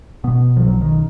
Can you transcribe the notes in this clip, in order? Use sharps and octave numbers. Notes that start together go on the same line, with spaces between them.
B2 B3
F3
B1 F#3
D#3